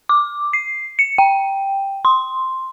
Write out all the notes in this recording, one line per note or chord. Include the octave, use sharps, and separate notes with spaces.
D6
C7
C#7
G5
C6